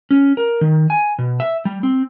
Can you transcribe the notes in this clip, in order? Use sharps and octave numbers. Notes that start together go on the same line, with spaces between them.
C#4
A#4
D#3
G#5
B2
E5
G3
C4